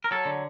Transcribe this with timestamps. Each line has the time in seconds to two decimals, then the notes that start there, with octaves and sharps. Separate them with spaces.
0.04 A#4
0.11 F#3 A4
0.25 D3